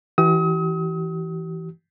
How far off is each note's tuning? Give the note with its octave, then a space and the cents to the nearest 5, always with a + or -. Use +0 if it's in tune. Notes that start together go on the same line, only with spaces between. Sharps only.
E3 +0 G4 -45 D#6 +40